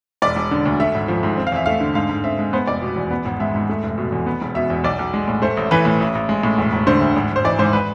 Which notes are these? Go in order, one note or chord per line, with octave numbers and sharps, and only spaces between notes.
E1 D5
E1
D3
D2
A3 E5
G#1
F3
G#2
C4
F5
E2 E5
A3 F5
D3
G#2 F5
G#2
C4 E5
G#3
B3 C5
F1 D5
B2
E2
B3
G#1
G#3 E5
G#2
A3
F1
B2
E2
B3
E1
B2 E5
E2
B1 D5
B1
G#3
A2
A3 C5
A1
E3 B4
A2
A1
A1
G#3
A2
E1
E1
D3 C5
D2
G#1
G#1
C5
E3 D5
G#2 C5
B4